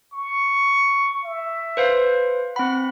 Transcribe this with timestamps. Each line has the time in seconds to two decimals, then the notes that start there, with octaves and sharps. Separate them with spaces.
0.13 C#6
1.25 E5
1.77 B4 C5 F5
2.56 C4 F#5 B5